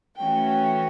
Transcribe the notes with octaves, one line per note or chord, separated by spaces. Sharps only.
E3 A3 C#4 F#4 G5